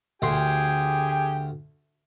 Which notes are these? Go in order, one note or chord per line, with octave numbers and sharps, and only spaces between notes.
D2 G4 G#4 G5 C6